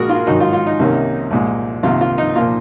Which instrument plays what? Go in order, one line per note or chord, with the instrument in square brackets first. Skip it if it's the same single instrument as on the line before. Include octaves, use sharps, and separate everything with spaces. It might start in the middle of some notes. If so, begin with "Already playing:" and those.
Already playing: [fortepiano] A#1 A#2 G#3 F#4 G#4 A#4
F4
G#1 G#2 D#3 F#3 D#4 F#4
F4
F4
D#4
C2 C3 D#3 A#3 C#4
C2 A#2 G#3
C2 C3 D#3 A#3 F4
F4
D#4
A#2 F3 A#3 F4